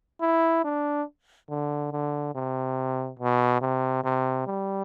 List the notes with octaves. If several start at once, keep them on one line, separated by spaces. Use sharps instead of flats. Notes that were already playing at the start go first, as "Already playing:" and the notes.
E4
D4
D3
D3
C3
B2
C3
C3
G3